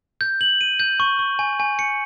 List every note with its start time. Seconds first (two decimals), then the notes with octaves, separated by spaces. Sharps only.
0.21 G6
0.41 F#7
0.61 D#7
0.80 G6
1.00 C#6
1.19 C#6
1.39 G#5
1.60 G#5
1.79 C#7